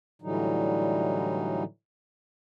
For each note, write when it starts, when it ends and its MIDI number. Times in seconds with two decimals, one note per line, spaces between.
0.22 1.64 45
0.22 1.64 50
0.22 1.64 52
0.22 1.64 54
0.22 1.64 55
0.22 1.64 63